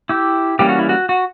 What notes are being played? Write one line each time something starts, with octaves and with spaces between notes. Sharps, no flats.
E4 G4
E3 G3 A#3 C#4 G4
F#4
E4
F#4
F#4